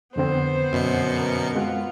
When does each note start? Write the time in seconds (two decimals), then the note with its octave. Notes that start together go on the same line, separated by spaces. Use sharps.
0.16 F2 D3 B3 C4 C5
0.72 F#2 B2 C#7
1.17 A#4
1.55 G#3 C4 F4 F#5